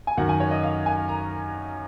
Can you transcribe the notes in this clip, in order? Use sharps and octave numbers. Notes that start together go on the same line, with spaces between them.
G#5
F#2 D#3 F#3 F#5
G#5
C#5
D#5
F5
G#5
A#5